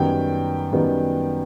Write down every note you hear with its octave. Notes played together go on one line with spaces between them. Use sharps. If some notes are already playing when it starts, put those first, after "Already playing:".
Already playing: F#2 D#3 G3 B3 G5
F#2 D#3 G3 B3